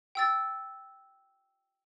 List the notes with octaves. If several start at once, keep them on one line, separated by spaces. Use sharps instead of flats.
G5 E6 A6